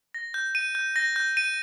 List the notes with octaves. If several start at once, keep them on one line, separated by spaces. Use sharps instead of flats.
A#6
G6
D#7
G6
A#6
G6
D#7